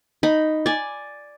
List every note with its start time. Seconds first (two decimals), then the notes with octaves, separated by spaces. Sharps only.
0.23 D#4 B5
0.66 D5 G#5